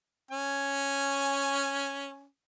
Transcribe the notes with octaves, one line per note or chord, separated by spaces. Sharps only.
C#4 G#5